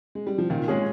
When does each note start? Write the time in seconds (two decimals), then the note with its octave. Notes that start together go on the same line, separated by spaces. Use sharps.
0.15 G#3
0.27 G3
0.38 F3
0.50 A#2 D#3
0.62 D#3
0.68 G#3 C#4 G#4